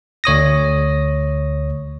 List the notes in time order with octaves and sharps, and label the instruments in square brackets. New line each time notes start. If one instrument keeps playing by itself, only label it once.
[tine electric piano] D2 C#5 D#6 A#6